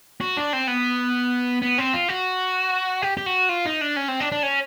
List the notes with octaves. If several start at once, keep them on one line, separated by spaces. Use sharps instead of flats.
F#4
D4
C4
B3
B3
C4
F4
F#4
G4
G4
F#4
F4
D#4
D4
C#4
C4
D4
D4
C#4